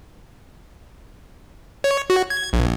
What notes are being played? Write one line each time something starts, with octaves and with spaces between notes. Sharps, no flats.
C#5
F#4
G#6
A#1